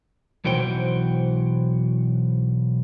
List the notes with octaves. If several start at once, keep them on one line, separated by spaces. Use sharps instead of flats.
B1 E3 F#4 C5 G5